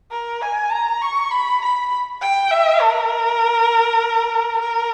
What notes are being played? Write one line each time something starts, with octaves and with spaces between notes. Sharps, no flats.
A#4
G#5
A#5
C#6
B5
B5
G5
E5
A#4
A#4